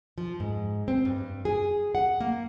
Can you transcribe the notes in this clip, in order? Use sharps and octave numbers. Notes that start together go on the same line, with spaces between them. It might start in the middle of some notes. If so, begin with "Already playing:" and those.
F3
G#2
C4
G2
G#4
F#5
A#3